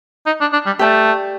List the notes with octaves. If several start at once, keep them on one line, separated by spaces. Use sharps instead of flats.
D#4
D4
D4
G3
A3 G4 D5 A5